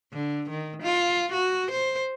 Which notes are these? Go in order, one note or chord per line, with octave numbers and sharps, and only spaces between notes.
D3
D#3
F4
F#4
C5